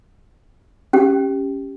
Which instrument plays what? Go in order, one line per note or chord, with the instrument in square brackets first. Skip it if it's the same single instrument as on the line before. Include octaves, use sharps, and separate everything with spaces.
[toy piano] C#4 G4